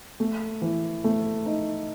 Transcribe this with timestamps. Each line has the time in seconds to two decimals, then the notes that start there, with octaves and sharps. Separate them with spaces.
0.20 A3
0.62 E3
1.04 A3
1.46 D#4